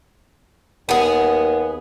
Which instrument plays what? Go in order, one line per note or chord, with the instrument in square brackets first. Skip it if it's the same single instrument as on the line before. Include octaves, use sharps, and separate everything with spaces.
[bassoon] D#2 [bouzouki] B3 G#4